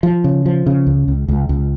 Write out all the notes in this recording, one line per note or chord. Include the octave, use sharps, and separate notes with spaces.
F3
C#3
F3
C#3
C#2
C#2
C#2
C#2